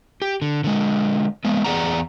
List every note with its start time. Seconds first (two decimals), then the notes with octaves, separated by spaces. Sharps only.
0.22 G4
0.42 D3
0.64 D3 G#3
1.45 G#3 A#3 B3
1.64 E2 G2 G#4 D5 F#5 A#5